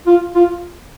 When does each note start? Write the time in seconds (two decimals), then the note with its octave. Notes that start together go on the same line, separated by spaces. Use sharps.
0.07 F4
0.35 F4